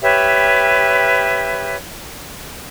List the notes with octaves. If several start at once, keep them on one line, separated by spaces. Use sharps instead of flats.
G4 B4 C#5 E5